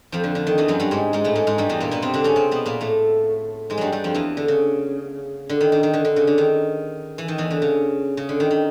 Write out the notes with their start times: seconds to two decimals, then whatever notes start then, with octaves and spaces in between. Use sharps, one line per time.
0.12 F2 F3
0.24 D3
0.35 D3
0.47 D#3
0.58 E2 E3
0.68 F#2 F#3
0.80 G2 G3
0.91 G#2 G#3
1.13 G#2 G#3
1.24 A2 A3
1.35 G#2 G#3
1.47 G#2 G#3
1.58 G2 G3
1.69 E2 E3
1.80 A#2 A#3
1.91 B2 B3
2.02 C3 C4
2.14 D3 D4
2.24 C#3 C#4
2.36 C3 C4
2.51 B2 B3
2.66 A#2 A#3
2.81 A2 A3
3.70 G#2 G#3
3.78 G2 F#3 G3
3.92 G2 G3
4.04 F2 F3
4.14 E2 E3
4.37 D3
4.48 C#3
5.49 D3
5.61 D#3
5.72 D#3
5.83 D#3
5.93 D3
6.05 D3
6.16 C#3
6.27 D3
6.38 D#3
7.18 E3
7.28 D#3
7.38 E2 E3
7.51 D3
7.62 C#3
8.17 C#3
8.29 D3
8.40 D#3
8.51 D#3